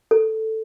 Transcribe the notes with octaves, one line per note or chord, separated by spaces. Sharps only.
A4